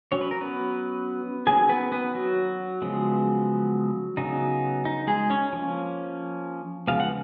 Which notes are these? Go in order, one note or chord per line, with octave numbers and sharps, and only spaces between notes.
F#3 C#4 C#5
B4
A#4
B3 B4
D#3 F#3 A#3 C#4 G#4 G#5
B3 B4
B3 B4
F#3 F#4
C#3 F3 G#3 B3
C#3 F#3 B3 D#4
D#4
G#3 G#4
C#4 C#5
F3 A#3 C#4
C#3 F3 G#3 B3 F5
F#5